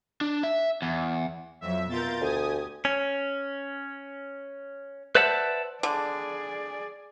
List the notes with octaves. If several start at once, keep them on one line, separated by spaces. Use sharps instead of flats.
D4
E5
E2
F2 F#3 E5
B2 F4 A#4 G6 A6
D2 G4 G#5 D#6
C#4
B4 C5 D5 E5 F#5 A5
D3 G#4 D5